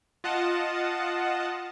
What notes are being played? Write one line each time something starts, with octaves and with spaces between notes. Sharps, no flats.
F4 D#5 F#5 A5